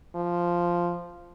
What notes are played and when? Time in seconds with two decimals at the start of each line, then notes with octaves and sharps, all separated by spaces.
0.15 F3